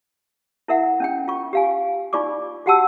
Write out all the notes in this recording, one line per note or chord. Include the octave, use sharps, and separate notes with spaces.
E4 A#4 E5 F#5
C#4 D4 G5
F4 C#6
G4 F5 G#5
D#4 F4 D5 C#6 D6
F#4 G4 F#5 G5 A5 E6